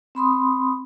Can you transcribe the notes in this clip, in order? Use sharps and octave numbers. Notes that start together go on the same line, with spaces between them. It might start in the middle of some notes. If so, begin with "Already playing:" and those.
C4 B5 C6 D#6